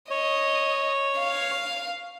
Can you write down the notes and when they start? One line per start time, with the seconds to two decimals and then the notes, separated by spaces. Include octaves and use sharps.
0.10 C#5 D#5
1.18 F5